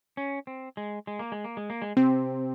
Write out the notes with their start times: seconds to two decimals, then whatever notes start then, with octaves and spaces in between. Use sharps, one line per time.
0.17 C#4
0.47 C4
0.77 G#3
1.07 G#3
1.19 A#3
1.32 G#3
1.44 A#3
1.57 G#3
1.70 A#3
1.82 G#3
1.97 C3 C4